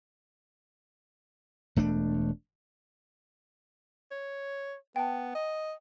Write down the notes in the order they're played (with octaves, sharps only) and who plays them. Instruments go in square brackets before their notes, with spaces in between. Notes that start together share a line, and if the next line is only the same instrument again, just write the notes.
[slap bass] E1 A3 D4
[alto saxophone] C#5
[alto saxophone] B3 [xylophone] G5 A5
[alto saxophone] D#5